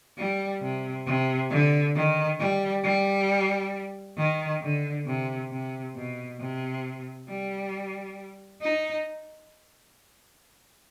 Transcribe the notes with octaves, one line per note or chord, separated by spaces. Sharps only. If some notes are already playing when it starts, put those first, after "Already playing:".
G3
C3
C3
D3
D#3
G3
G3
D#3
D3
C3
C3
B2
C3
G3
D#4